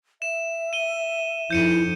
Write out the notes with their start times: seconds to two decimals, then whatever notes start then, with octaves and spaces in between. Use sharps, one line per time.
0.22 E5 E7
0.73 D#7 G7
1.51 F2 D#4 E4 G6 C#7 D#7